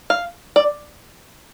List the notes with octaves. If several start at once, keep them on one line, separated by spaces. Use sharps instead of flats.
F5
D5